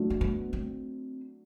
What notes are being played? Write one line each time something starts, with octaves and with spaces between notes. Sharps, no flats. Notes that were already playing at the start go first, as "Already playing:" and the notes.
Already playing: F#3 A3 D4
A#3
B3
C4